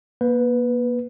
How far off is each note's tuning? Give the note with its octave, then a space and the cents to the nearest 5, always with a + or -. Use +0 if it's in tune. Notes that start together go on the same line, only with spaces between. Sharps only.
A#3 +35 B4 +0